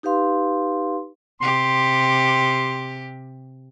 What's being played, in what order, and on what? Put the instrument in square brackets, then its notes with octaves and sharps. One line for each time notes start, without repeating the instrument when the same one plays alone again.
[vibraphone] D#4 G4 B4 F5 C6
[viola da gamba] C3 G4 [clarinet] C6